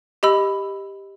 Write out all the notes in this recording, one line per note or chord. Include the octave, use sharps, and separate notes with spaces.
G4 D#5 B5 E6